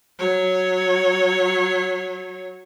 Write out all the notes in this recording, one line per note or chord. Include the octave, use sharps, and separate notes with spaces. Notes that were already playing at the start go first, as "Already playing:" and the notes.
F#3 C#5